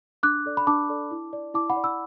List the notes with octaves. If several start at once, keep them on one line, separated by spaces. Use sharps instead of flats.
D4 D6 F#6
A4 D5
B5
D4 A5 D6
A4 D5
E4
D5
E4 A5 D6
F#5 B5
D5
B5 E6